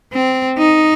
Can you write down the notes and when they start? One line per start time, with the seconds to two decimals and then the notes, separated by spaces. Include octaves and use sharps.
0.13 C4
0.59 D#4